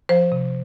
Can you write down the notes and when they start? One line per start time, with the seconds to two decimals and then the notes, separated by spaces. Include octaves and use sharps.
0.09 F3 C5
0.32 C3